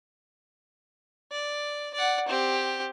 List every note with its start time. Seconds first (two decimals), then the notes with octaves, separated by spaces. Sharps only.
1.32 D5
1.94 D5 F#5
2.28 C4 G4